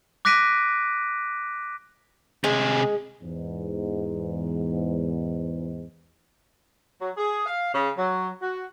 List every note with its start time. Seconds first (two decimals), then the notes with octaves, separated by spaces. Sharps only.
0.25 D6 F#6 A#6 B6 D7 D#7
2.44 C3 G#3 G#4
3.22 E2 G#2
7.01 F#3
7.17 G#4
7.46 F5
7.74 C#3
7.96 F#3
8.41 F#4